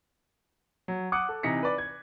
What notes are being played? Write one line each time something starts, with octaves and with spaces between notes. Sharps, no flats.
F#3
F#5 D6 D#6 F#6 C#7
A4
C3 E3 D#4 A#6 B6 C#7
B4 D5
G#6